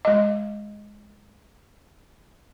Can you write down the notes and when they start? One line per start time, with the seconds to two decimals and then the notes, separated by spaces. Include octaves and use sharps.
0.05 G#3 D#5